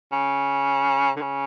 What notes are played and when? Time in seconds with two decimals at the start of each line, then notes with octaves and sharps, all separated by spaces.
0.12 C#3
1.16 D3
1.21 C#3